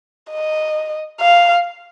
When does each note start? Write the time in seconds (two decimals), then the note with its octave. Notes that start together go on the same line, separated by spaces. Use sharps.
0.31 D#5
1.21 F5